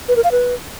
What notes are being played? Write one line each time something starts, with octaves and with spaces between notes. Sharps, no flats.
B4
A#4
F5
B4